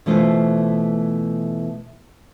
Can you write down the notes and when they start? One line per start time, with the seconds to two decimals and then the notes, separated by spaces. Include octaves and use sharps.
0.06 B2 E3 A3 F4 C5